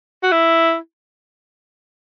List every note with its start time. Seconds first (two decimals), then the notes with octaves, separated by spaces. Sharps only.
0.23 F#4
0.32 E4